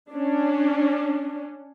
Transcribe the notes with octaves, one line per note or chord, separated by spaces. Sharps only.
C#4 D4